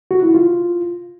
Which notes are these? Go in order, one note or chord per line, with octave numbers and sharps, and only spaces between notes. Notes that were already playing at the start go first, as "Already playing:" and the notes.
F#4
E4
F4